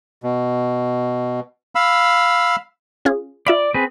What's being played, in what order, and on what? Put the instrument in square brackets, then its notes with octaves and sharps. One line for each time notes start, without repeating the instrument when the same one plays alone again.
[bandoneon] B2
F5 B5 E6
[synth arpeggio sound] C#4 F4 G#4
[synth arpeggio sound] F4 E5 B5 [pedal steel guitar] D5
[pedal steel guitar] C4 G#4 B4